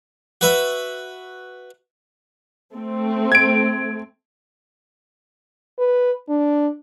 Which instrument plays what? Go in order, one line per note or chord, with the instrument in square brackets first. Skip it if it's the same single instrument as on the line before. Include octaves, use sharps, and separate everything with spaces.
[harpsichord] F#4 B4 E5
[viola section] A3 C4
[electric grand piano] G#6 D7
[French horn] B4
D4